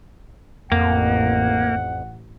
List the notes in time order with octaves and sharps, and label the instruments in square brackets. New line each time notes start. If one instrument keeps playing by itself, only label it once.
[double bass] A1 [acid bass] F2 [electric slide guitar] A#3 [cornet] F#5